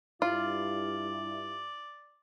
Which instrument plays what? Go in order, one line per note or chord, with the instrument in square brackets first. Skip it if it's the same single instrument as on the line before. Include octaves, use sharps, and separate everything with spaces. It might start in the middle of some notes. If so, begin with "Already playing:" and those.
[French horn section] G2 E4 [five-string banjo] F4 [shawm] D5